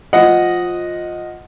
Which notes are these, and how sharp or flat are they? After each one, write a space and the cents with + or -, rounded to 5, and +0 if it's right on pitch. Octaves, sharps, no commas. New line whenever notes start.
F3 +15 D#5 +0 F#5 +0